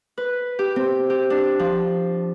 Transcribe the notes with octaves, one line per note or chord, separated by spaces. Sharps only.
B4
G4
C4
G4
D4
F3